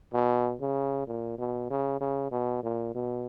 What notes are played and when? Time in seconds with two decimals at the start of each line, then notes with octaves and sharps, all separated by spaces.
0.13 B2
0.61 C#3
1.07 A#2
1.38 B2
1.70 C#3
2.01 C#3
2.31 B2
2.63 A#2
2.94 B2